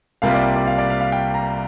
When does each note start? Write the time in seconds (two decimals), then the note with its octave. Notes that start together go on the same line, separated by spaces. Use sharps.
0.22 C2 C3 G3 A#3 F4 F5
0.34 D5
0.56 D5
0.67 F5
0.78 D5
0.90 F5
1.01 F5
1.12 G5
1.34 A#5